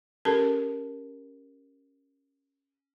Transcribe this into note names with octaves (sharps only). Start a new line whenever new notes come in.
C#4 G4 A4 A#4 A5